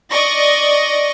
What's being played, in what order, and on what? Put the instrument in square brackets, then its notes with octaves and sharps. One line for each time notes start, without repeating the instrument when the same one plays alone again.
[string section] D5 D#5 C#6 A#6